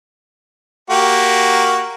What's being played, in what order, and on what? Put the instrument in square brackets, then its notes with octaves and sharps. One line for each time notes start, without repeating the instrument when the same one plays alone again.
[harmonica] A#3 F#4 G4